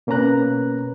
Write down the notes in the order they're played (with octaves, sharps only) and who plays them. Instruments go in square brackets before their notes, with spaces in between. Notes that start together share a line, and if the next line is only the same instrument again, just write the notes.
[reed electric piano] B2 A#3 C#4 B4 A#5 F#6